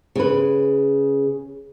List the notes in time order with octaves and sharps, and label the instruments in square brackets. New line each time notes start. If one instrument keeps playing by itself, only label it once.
[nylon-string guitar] C#3 B4